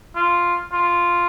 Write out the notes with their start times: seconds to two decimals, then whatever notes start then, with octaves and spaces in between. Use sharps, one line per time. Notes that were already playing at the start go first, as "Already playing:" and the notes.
0.16 F4
0.72 F4